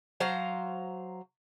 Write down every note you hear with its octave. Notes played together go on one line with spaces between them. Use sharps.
F#3 C5 F5 A#5